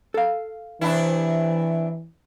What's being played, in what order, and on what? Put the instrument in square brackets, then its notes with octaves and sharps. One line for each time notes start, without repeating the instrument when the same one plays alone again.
[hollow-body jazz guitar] A4 F5
[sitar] C3 D4 E4 [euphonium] E3